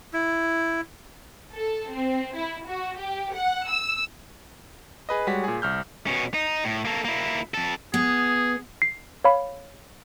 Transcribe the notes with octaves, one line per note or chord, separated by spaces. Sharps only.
E4
A4
C4
E4
F#4
G4
F#5
E6
G#4 B4 D#5
G3 G#3 F#4 C#5 B6
A#2 G#4
C2 F6 G6
B2 C#4
D#4
A2
A#3 A4
A#3 E4
F2 A4
B3 G#4
C7
C#5 F5 B5